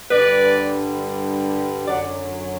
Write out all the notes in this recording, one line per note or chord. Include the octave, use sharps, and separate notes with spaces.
G2 D3 G3 B4 D5
F#2 D3 F#3 D5 F#5